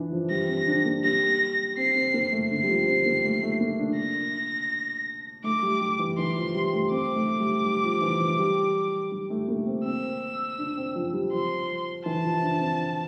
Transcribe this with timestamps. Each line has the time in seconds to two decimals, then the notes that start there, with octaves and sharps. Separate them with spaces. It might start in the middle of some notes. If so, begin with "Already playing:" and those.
Already playing: E3 D4
0.12 F3
0.30 G3 A#6
0.49 C4
0.67 D4
0.85 A#3
1.03 G3 A#6
1.77 C4 C7
1.95 C4
2.14 A#3
2.32 A3
2.51 D3 C7
2.63 G3
2.69 F3
2.87 C4
3.06 A#3
3.24 A3
3.43 A3
3.61 A#3
3.79 D4
3.97 A#6
5.44 A3 D6
5.63 G3
5.81 G3
5.99 E3
6.18 E3 C6
6.37 F3
6.55 G3
6.73 A3
6.91 C4 D6
7.16 A3
7.40 G3
7.65 G3
7.84 F3
8.02 E3
8.20 E3
8.39 G3
9.12 G3
9.30 A3
9.48 A#3
9.66 C4
9.85 C4 E6
10.59 D4
10.77 C4
10.95 F3
11.13 G3
11.32 F3 C6
12.06 E3 A5
12.24 F3
12.43 D4
12.61 C4